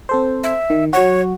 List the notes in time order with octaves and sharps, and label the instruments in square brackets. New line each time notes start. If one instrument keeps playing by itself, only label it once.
[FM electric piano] C4 A4 C5
[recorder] E5
[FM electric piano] D#3
[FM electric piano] F#3 F#4 [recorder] C#5